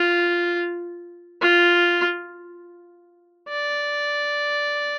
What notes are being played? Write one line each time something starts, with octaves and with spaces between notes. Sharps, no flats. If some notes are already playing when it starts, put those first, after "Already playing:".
Already playing: F4
F4
D5